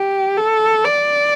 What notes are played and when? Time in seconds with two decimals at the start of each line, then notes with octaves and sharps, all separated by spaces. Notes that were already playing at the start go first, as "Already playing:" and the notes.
Already playing: G4
0.37 A4
0.85 D5